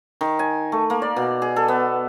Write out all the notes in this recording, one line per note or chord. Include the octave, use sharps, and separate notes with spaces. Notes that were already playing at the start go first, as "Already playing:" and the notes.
D#3
G#5
A3
A#3
D5
B2
G#4
A4
B3